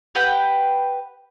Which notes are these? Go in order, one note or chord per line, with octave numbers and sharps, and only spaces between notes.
G4 B4 F#5 G5